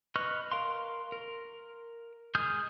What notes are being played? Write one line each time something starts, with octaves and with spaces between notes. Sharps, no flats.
B4 D#5 C#6 F6 F#6
A#4 F5 C6
A#4
G#3 G#4 D#6 F6 G6